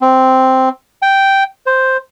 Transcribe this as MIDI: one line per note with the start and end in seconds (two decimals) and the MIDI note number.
0.01 0.69 60
1.02 1.43 79
1.66 1.97 72